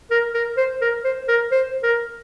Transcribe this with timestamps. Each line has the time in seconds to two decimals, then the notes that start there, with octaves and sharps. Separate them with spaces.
0.11 A#4
0.34 A#4
0.57 C5
0.81 A#4
1.04 C5
1.28 A#4
1.52 C5
1.83 A#4